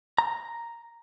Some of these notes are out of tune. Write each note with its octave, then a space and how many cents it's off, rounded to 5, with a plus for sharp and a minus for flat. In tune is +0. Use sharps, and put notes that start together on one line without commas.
A#5 +0